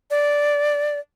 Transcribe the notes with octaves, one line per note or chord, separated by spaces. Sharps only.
D5